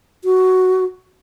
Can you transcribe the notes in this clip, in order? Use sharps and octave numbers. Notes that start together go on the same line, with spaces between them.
F#4